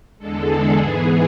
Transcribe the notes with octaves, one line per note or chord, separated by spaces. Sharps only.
E2 D3 G#3 A4
G#4
G#2 E3 B3